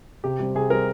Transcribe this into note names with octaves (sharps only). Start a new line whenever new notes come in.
C3 G4
G3 C4
C3 G#4
G3 C4 A#4